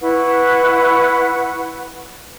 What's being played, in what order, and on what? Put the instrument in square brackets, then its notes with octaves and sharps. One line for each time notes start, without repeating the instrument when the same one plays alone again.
[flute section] E4 B4 F#5 C#6